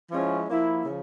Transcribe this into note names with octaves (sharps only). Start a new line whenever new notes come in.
F3 G#3 C#4 E4
F3 A#3 E4
C#3 F3